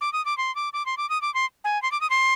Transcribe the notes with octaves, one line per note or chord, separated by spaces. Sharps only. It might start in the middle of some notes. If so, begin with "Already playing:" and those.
D6
D#6
D6
C6
D6
D6
C6
D6
D#6
D6
C6
G#5
C6
D6
D#6
C6